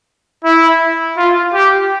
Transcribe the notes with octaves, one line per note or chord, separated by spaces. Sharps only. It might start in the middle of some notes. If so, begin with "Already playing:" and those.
E4
F4
G4